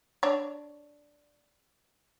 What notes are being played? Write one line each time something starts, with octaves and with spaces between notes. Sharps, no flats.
D4 C#5